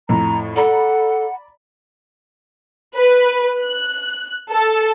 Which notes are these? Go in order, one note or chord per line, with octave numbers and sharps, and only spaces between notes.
F2 A2 A#5
A4 D5 F#5 A#5 B5
B4
F#6
A4